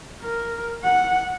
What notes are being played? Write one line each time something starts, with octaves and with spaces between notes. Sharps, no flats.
A#4
F#5